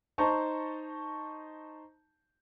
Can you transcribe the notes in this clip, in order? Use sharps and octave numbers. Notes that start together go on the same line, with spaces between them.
D#4 C5 A5 A#5 C#6